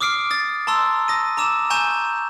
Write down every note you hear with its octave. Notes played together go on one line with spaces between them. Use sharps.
D6 D#6 F6 C7 D7
D#6 A6
A5 A#5 C6 E6
D#6 A#6 D#7
A#5 D6 E6 E7
G#5 A#5 C#6 G6 E7